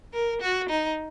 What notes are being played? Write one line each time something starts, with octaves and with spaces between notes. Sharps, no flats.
A#4
F#4
D#4